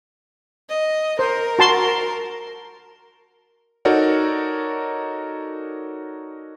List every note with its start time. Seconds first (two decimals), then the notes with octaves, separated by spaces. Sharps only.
0.69 D#5
1.19 A#4 C5
1.59 F#4 A5 C6
3.85 D#4 F#4 A4 A#4 C#5 D5